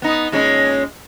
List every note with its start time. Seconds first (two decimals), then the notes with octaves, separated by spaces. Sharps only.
0.02 B3 D#4
0.32 A#2 G#3 C#4